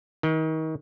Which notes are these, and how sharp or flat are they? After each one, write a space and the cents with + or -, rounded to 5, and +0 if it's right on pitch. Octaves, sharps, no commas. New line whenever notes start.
D#3 +35